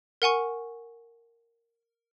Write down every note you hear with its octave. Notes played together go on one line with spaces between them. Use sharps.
A#4 F#5 G#5 C#6